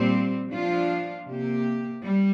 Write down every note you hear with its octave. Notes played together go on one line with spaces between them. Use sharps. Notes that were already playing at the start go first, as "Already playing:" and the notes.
Already playing: A#2 G3 C4
F3 D4 F4
C3 A#3 G4
G3